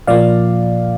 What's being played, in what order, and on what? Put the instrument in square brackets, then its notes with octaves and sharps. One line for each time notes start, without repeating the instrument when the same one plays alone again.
[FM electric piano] A#2 F3 A#3 D5 F5